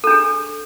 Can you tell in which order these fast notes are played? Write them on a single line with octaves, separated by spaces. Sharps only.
A4 D4 G#4